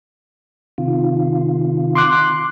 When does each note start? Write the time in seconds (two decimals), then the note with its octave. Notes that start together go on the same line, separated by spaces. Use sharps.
0.78 C3 D#3 F4
1.95 C6 D6 F#6